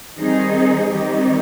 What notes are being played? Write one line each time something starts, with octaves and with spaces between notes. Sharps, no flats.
D#3 G3 C4 D#4 G#4
D#3 G3 C4 D#4 G4